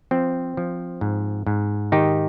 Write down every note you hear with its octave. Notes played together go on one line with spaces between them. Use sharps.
F3 C4
F3
G#2
G#2
D#3 D#4 G4